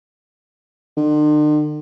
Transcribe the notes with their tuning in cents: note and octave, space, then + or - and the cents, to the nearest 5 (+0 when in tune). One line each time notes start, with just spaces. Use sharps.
D3 +45